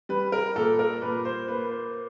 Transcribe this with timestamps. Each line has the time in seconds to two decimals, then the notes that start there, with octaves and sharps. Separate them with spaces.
0.09 G3 B4
0.32 A#4
0.55 A#2 A4
0.79 A#4
1.02 A#2 B4
1.25 C5
1.48 A#3 B4
1.71 C5